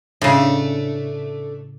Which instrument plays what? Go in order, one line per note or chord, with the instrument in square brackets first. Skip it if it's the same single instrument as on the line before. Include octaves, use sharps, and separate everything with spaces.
[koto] A2 C#3 [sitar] A3 D4